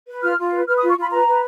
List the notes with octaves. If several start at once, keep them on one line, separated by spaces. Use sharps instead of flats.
B4
F4 F6
F4
B4
B4 F6
D#6
F4
C#6
F4 B5
B4 A#5
B4